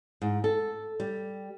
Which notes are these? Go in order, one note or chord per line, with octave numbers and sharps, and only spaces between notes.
G#2
A4
G3